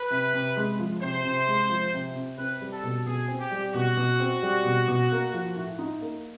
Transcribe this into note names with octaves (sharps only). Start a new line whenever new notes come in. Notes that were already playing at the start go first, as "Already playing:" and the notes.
Already playing: B4
C3
C3
G#3
F3
C3 C5
C3
G#3
F3
C3
C3
C4 B4
G3
A4
B2
B2 G#4
C4
G4
G3
B2 F#4
B2
C4
G3
B2
B2
A#3
F3
A2
D#4
A#3